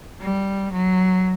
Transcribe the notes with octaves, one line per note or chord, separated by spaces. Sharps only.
G3
F#3